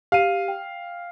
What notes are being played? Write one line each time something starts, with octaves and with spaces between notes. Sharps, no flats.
G4 F5 D#7
G5